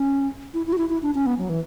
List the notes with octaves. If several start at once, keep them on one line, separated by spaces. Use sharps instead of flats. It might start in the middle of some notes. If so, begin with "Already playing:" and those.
Already playing: C#4
E4
E4
F#4
E4
E4
D4
C#4
B3
F#3
E3